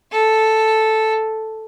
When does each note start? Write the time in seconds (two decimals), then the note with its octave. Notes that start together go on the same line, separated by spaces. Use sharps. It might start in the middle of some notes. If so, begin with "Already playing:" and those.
0.11 A4